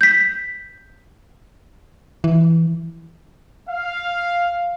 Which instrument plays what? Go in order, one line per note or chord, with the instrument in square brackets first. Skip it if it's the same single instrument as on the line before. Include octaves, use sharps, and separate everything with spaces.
[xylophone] G6 B6
[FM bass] E3
[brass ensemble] F5